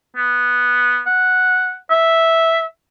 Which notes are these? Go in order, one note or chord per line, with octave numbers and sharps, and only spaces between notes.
B3
F#5
E5